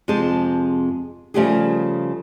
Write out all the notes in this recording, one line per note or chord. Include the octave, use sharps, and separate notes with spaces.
F2 C3 G#3 G#4 C5 A5
C#3 F3 G3 A3 G4 G#4